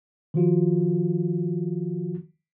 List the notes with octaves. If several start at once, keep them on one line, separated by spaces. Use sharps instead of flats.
D#3 F3 F4 F#4